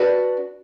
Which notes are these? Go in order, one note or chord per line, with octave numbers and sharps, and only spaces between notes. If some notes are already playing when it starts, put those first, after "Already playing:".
Already playing: D4 F#4 B4 D5